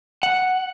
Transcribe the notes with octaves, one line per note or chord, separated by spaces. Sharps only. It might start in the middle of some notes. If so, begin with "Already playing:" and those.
F#5